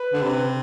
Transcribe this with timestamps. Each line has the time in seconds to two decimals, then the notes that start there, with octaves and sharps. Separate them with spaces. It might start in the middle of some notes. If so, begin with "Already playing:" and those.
Already playing: B4
0.13 D3
0.22 C3